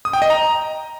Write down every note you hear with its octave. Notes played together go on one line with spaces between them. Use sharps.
D#6
G5
D#5
A#5